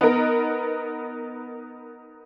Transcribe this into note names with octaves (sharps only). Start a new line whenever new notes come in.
B3 D#4 A#4